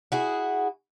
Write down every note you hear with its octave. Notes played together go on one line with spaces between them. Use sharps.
E4 F#4 G#4